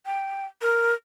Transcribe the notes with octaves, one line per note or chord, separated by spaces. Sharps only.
G5
A#4